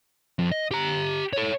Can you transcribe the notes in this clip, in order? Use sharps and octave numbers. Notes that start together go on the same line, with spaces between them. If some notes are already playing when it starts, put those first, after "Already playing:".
F2
D#5
G4 A#5
A4 C#5